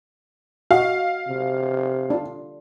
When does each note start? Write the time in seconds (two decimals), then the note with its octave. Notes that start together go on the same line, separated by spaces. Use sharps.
0.71 F#4 D#5 F5
1.27 C3
2.10 D4 F4